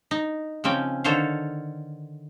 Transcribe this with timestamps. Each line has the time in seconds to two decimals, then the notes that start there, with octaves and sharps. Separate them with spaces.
0.11 D#4
0.64 C#3 F3 C4 C#4 G5
1.04 D3 D#3 A4 C5 C#5 F5